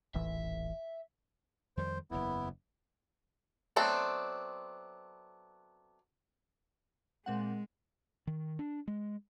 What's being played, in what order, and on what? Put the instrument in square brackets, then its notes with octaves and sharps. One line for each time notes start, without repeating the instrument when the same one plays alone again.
[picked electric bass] D#1 A1 E3 [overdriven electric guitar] E5
[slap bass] F2 D#3 G3 [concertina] C5
[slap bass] F#1 E2 [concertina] B3 E4
[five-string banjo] F#3 A3 B3 C4 D4
[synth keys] A#2 C4 F#5 [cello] G#3
[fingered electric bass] D#3
D4
G#3